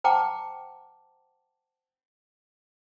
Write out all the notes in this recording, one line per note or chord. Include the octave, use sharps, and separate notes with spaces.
C5 F#5 G5 A5 A#5 D6